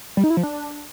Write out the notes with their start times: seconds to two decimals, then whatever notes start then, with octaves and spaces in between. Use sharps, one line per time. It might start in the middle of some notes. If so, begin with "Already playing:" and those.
0.17 G3
0.24 D#4
0.30 E4
0.37 F3
0.43 D4